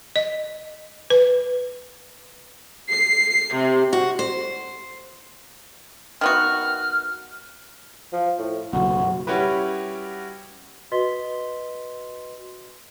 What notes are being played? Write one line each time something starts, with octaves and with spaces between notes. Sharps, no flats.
D#5
B4
C7
C3
F#4
C5
D#3 B3 F#4 F6
F3
A2
F#1 B1 F#4
G3 C#4 E4 F#4 G4 B4
F#4 B4 D#5 C6 B6 G7